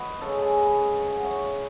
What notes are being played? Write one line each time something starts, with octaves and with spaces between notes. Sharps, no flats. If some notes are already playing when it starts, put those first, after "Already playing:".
Already playing: F#4 B4 D#5
C#3 G#3 A4 C#5
G#4 B4
B4 D#5
G#5
F#5
C#5 E5